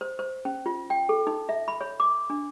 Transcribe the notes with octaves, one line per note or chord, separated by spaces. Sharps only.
C5
C5
C#4
F4
G5
A4
D#4
E5
B5
C#5
D6
D4